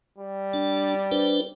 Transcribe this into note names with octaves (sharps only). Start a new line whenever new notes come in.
G3
D4
D4 B4 C5